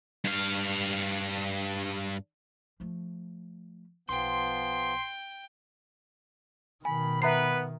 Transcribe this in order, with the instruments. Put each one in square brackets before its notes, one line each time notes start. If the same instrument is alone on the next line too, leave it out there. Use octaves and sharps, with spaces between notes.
[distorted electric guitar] G2 F5
[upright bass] F3 A3
[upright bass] B1 [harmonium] F3 B3 [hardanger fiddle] G5 [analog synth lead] C6
[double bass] B2 D#3 [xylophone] G#5 [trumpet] B5
[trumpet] B3 [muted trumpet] B4 [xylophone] E5 A#5 C7